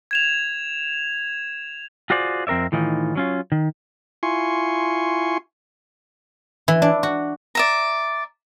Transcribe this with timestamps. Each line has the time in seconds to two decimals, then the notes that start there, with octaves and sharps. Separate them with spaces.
0.11 G#6 E7 F7
2.10 F4 F#4 G#4 C5 D5
2.47 F2 C4 A#4 D5 E5
2.72 A2 D#3 E3 D#4 F4
3.15 F#3 C#4 F4
3.52 D#3
4.23 E4 F4 G#5 C6 C#6
6.68 E3
6.82 D4
7.03 F#4
7.55 D5 E5 A#5